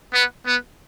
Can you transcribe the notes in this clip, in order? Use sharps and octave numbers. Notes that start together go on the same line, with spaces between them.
B3
B3